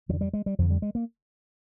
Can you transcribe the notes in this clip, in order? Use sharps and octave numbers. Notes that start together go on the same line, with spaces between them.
F2 D3 F3
G3
G#3
G3
F2 D3 F3
G3
G#3
A#3